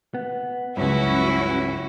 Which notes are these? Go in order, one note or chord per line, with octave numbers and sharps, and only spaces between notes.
B3
C#2 G2 F#3 B3 C#4 E4 F#4 B4